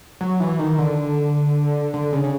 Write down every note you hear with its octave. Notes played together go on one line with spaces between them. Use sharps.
F#3
E3
D#3
D3
D3
C#3
C#3